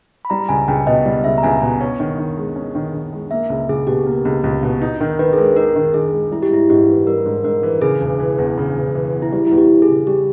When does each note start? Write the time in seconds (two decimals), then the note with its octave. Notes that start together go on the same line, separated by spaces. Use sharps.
0.25 B5
0.30 G3 A#5
0.49 C#2 G#5
0.68 C#2 G5
0.87 B2 D#5
1.05 G3
1.24 C#2 E5
1.38 A#5
1.43 C#2 G#5
1.62 B2
1.80 C#4
2.00 D#3
2.18 D#3
2.37 G#3
2.56 C#4
2.75 D#3
2.94 D#3
3.12 G#3
3.31 A#3 E5
3.50 C#2
3.69 C#2 G#4
3.87 B2 G4
4.06 A#3
4.25 C#2
4.44 C#2
4.63 B2
4.82 D#4
5.00 D#3 A#4
5.19 D#3 B4
5.33 G#4
5.38 G#3 A#4
5.56 D#4 A#4
5.76 D#3
5.94 D#3 G#4
6.12 G#3
6.31 G3 E4
6.42 G4
6.51 G#2 E4
6.69 G#2 G4
6.88 E3
7.07 G3 A#4
7.26 G#2
7.44 G#2 A#4
7.63 E3
7.82 C#3 G#4
8.01 E1
8.20 E3
8.38 E2
8.58 C#3
8.76 E1
8.94 E3
9.14 E2
9.22 E4
9.32 G3 G4
9.47 E2 E4
9.58 G4
9.70 E2
9.82 G#4
9.89 C#3
10.07 G3 G4